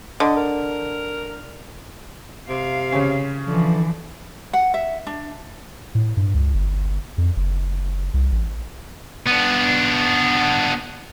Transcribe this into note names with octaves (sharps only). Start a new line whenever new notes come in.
D3 D#5
A#4
C3 F5
C#3 C#4
D3 E3 F3
F#5
E5
D4
A2
G2
C#2
G1
F2
F#1
C2
A1
B3 D4